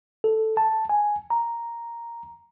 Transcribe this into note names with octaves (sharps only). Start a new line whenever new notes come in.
A4
A5
G#5
A#5